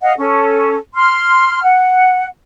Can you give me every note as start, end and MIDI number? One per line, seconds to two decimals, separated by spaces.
0.01 0.12 75
0.01 0.12 77
0.01 0.12 78
0.17 0.77 61
0.17 0.77 69
0.95 1.63 84
0.95 1.63 89
1.64 2.26 78